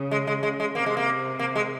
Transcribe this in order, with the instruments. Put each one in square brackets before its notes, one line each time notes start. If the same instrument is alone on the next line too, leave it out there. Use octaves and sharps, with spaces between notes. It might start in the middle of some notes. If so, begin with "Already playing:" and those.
Already playing: [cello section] C#3
[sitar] G#3
G#3
G#3
G#3
[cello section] C3 [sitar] A#3
[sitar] G#3
A#3
A#3
G#3